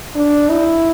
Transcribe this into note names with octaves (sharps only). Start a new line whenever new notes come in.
D4
E4